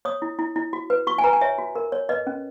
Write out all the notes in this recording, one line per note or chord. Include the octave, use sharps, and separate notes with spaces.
C#5 D#6
E4
E4
E4
F#4
B4
F#4 C#6
G#5
B4 A#5
G#5
C#5 E5
F#4
A#4
C#5
B4 D#5
C#4